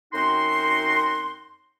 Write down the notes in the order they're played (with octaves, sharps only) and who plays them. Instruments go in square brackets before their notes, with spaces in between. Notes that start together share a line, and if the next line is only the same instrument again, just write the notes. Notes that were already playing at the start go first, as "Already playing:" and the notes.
[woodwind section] F#2 C4 D#4 F#4 C6